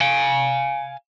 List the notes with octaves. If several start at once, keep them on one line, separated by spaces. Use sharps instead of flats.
F5 G#5